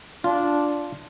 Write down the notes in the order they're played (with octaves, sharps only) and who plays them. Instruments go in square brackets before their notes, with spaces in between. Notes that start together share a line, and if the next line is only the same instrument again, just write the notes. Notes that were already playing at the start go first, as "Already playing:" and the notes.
[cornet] D4 [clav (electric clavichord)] F4